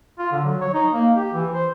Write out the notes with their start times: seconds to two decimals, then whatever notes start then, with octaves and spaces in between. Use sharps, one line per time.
0.19 F4
0.32 D3
0.44 F#3
0.61 C#5
0.74 D#4
0.93 A#3
1.15 G4
1.34 E3
1.54 C5